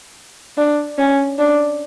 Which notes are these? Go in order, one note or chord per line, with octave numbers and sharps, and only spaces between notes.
D4
C#4
D4